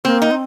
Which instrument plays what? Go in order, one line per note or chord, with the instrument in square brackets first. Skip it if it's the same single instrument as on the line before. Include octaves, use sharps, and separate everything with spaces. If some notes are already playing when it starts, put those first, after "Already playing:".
[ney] A#3 [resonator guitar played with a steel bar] C4
[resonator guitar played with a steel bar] D#4
[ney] C4